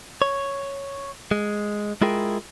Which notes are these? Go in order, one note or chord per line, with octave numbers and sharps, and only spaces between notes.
C#5
G#3
G#3 E4 F4 G#4 A#4 G5